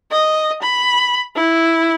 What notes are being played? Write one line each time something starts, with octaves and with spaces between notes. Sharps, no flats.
D#5
B5
E4